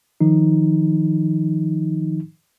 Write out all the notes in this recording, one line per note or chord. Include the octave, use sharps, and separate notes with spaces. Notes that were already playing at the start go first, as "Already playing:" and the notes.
D#3 F3 D#4